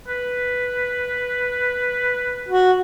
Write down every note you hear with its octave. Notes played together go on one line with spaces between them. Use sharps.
B4
F#4